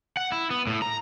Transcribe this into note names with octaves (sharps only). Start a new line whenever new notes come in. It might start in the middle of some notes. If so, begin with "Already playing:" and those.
F#5
E4
B3
A2
A#5